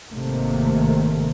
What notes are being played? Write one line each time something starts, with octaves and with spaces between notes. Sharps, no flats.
G#1 C3 D#3 A3 A#3